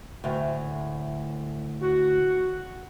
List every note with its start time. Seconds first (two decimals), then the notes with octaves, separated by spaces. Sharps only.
0.24 D2 A2
1.82 F#4